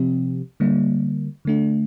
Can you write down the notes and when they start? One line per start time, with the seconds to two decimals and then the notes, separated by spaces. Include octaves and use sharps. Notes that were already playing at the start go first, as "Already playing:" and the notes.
Already playing: C3 F3 C4 G4
0.60 D3 G3 A#3
1.45 D3 A3 D4